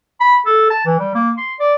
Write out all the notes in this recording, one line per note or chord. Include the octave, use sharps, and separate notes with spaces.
B5
A4
A5
E3
G3
A#3
C6
D5